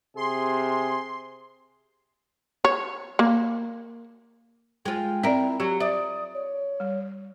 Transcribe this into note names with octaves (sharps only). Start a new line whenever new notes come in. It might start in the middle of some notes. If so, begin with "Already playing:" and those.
C3 G#4 C6
C#5
A#3
G#3 F4 G5
C4 E4 A#4 D5
F#3 G4
D5 E5 D#6
C#5
G3